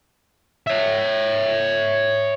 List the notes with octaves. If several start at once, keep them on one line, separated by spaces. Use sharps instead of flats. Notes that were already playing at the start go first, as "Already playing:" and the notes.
C#5 E5